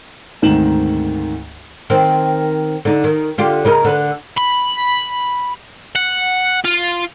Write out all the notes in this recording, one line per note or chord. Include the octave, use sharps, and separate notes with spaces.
D2 G#2 D#3 C4 E7 F#7
D#3 C4
D3 D#4
D#3
D3 F4 G4
C#3 D#4 A#4
D3 B4
B5
F#5
F4